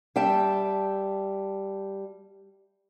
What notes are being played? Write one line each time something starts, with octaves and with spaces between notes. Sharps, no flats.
G3 E5 G5 A5